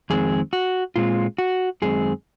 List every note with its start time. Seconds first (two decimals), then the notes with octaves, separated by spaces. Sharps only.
0.10 F2 D#3 G#3 C4 G#4
0.53 F#4
0.96 A#2 G#3 C4 F4
1.38 F#4
1.82 F#2 D#3 G#3 C4 G#4